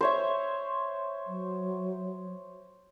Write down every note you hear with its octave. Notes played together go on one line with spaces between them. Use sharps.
C5 C#5 E5
F#3